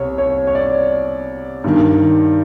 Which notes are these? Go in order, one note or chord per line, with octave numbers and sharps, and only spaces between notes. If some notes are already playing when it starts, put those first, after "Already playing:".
Already playing: C2 C#5
C#5
C#5
D5
G2 D#3